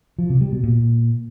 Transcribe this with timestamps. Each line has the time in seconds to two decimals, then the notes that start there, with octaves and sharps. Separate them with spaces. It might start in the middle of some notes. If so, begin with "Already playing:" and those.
0.19 F3
0.30 C3
0.41 G3
0.52 B2
0.64 A#2